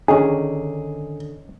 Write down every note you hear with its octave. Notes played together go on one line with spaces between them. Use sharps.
D3 D#3 C#4 D#4 G#4